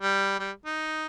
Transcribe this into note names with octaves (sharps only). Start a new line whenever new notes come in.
G3
G3
D#4